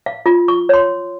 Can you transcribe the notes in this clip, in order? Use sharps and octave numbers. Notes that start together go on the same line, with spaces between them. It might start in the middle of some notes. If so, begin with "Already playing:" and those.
F5
F4
C#6
C#5 C6